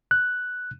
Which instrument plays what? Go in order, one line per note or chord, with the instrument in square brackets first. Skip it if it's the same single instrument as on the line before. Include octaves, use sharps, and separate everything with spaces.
[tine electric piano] F#6